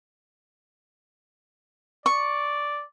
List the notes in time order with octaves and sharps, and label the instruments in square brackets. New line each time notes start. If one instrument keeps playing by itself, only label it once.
[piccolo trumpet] D5 [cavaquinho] C#6